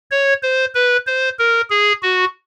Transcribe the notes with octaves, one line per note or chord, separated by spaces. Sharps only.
C#5
C5
B4
C5
A#4
G#4
F#4